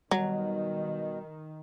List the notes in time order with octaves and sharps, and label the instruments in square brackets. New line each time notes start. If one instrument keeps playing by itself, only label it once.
[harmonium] B2 [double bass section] D#3 [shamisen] F#3 [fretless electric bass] G3